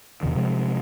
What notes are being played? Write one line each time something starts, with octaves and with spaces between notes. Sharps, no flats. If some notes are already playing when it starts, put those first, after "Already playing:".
E2 C3 D#3
C3 F3 G#3